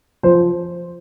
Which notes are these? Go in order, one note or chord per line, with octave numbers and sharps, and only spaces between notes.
F3 C5